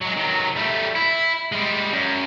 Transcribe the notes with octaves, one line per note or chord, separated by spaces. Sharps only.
F#3 G#3
D#3 F#3
G3 A3
E4
G3 G#3
F#2